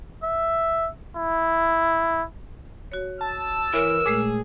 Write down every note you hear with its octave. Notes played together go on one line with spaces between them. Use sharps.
E5
E4
F#4 C#5
A5 E6
E3 A#4 C#5
A#2 G#3 A3 G#4